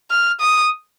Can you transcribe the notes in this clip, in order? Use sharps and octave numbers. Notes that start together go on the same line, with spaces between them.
F6
D#6